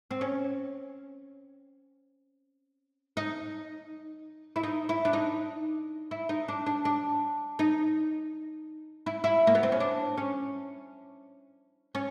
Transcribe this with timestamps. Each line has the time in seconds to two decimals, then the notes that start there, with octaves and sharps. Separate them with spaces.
0.11 C4
0.21 C#4
3.17 D#4
4.56 E4
4.63 D#4
4.89 E4
5.05 D4
5.13 D#4
6.11 E4
6.29 D#4
6.48 D4
6.66 D4
6.85 D4
7.59 D#4
9.06 E4
9.24 E4
9.47 A#3
9.55 B3
9.63 C4
9.72 C#4
9.80 D4
10.18 C#4
11.95 C#4